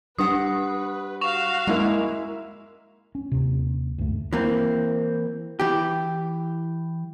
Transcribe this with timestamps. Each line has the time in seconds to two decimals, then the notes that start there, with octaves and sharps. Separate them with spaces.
0.18 G3 D4 B4 F#5 D#6
1.21 F#4 F5 C#6 E7 F7
1.67 G#3 A#3 E4
3.15 C#4
3.32 D#2 C3
3.98 D2 G2 A3
4.33 E3 A#3 C4
5.60 E3 G4